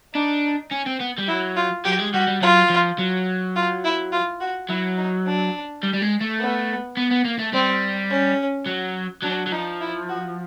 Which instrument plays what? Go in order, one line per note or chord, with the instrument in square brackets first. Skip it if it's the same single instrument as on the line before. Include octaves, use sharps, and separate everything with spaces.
[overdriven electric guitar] D4 [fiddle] D#4
[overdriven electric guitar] C#4
C4
B3
G3
[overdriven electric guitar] F#3 [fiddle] E4
[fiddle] F4
[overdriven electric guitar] F#3 [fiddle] G4
[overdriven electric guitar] G#3
[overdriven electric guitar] G3 [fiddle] F#4
[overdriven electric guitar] G3
[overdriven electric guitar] F#3 [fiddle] F4
[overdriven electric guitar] F3
F#3
[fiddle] F4
E4
F4
F#4
[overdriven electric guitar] F#3 [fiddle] E4
[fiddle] D#4
D4
[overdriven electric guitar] G3
G3
G#3
A3
[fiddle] B3
[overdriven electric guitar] B3
B3
A#3
A3
[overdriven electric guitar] G3 [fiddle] C4
[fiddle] C#4
[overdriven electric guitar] F#3
[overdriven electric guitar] F#3 [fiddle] D4
[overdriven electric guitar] F#3
[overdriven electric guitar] F3 [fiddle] D#4
[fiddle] E4
F#4